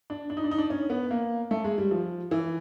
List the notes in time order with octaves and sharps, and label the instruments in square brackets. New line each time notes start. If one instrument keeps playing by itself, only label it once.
[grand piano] D4
D4
D#4
D4
D#4
D4
C#4
B3
A#3
A3
G#3
G3
F3
E3